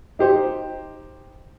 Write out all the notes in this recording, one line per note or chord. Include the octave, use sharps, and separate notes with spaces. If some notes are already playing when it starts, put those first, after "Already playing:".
D#4 G4 C5